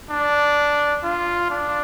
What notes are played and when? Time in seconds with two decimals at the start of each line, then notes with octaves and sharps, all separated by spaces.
0.10 D4
1.03 F4
1.50 D4